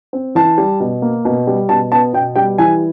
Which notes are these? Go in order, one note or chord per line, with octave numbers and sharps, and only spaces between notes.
C4
E3 A5
G3
B2
A#3
B2
G3
B2 A5
B3 A5
B2 G5
G3 G5
E3 G#5